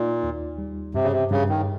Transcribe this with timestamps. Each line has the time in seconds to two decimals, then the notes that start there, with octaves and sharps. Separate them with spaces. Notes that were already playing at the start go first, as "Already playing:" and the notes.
Already playing: A#2 D#4
0.23 D#2
0.58 G3
0.94 G2 C3
1.04 C#3
1.12 C3
1.31 G2 C#3
1.49 D#3